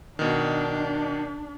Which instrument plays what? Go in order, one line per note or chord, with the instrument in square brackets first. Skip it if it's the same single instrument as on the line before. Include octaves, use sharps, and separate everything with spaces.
[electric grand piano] B2 D#3 [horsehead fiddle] D4